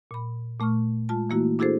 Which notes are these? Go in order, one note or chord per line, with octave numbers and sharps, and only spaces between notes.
A#2 B5
A#2 A3 C#6 F6
G#3 F4 A5
E3 A3 A#3 E4 F#4
D4 E4 F#4 G#4 A4 C5